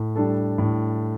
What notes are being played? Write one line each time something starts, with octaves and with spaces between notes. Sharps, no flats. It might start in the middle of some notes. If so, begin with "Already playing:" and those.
Already playing: A2
G3 D4 A4
A2